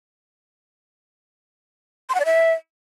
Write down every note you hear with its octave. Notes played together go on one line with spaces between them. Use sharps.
C6
F#5
D5
E5